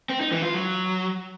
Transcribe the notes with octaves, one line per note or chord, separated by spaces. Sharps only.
C4
D#4
E3
F4
F#3